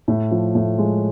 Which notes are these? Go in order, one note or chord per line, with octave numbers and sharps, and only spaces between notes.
A2
F3
A2
G#3